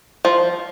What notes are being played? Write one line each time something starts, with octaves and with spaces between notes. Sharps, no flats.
F3